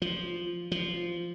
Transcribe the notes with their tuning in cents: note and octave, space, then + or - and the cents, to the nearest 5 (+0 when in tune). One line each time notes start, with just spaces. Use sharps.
F3 +0
F3 -10